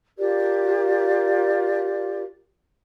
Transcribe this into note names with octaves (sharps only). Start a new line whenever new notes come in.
F4 G4 A#4 D5